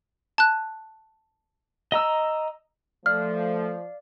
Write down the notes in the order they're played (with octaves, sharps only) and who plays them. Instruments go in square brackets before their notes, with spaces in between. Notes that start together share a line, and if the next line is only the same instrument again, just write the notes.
[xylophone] A5 F#6
[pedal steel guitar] D#5 A#5 E6
[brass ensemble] F3 [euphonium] A3 [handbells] D5 F5 [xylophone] F6